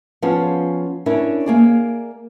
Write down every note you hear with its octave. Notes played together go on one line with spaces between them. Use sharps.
F3 B3 C#4 F4 G#4
C#4 D4 E4 A#4 C#5
A#3 G#4 D5